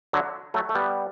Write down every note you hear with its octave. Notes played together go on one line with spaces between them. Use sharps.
D3 F#3
F#3 A3
A3
G3 B3